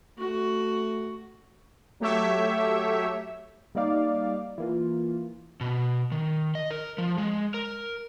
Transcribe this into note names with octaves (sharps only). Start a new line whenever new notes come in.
A3 F#4
F#3 A3 G4 C#5 E5
G3 A#3 D#4 D5 F5
E3 A#3 F4
B2
D#3
D#5
A#4
F3
G#3
A#4